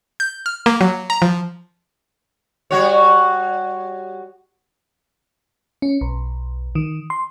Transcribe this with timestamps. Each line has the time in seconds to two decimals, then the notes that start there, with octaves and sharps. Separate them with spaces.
0.20 G6
0.46 F6
0.66 A#3
0.81 F#3
1.10 A#5
1.22 F3
2.71 G3 F#4 C#5
5.82 C#4
6.01 B1
6.75 D#3
7.10 C6